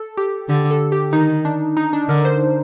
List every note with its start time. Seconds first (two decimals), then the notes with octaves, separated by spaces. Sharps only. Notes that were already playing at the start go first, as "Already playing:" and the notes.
Already playing: A4
0.17 G4
0.49 D3 G4
0.71 A4
0.92 G4
1.12 D#3 D#4
1.45 D4
1.77 D#4
1.93 D4
2.09 D3 A#4
2.25 C5